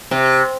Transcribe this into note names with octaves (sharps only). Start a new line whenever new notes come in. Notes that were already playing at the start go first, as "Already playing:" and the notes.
C3